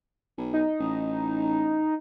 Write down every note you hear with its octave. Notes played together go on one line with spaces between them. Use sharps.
B1
D#4
A1